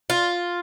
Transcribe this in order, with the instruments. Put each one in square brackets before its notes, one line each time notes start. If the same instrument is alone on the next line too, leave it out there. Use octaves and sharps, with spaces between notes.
[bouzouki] F4